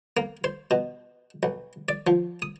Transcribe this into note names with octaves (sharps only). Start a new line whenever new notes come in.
A#3
C5
B2
B1
D5
F3
D#6